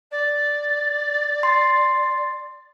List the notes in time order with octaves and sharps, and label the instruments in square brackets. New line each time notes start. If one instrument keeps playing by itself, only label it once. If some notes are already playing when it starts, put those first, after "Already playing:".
[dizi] D5
[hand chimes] C6